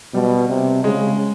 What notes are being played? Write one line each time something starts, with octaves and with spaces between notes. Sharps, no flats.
B2 G3
C3
C#3 G#3